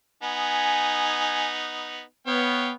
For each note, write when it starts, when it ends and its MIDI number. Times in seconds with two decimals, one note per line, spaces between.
0.23 2.02 59
0.23 2.02 63
0.23 1.50 80
2.27 2.72 59
2.27 2.69 73
2.27 2.69 77
2.27 2.69 79